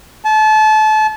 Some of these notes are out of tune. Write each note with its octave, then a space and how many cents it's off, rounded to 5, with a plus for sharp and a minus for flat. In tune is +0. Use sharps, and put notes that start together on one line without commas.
A5 -30